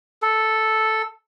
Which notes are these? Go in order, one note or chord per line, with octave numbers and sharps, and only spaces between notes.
A4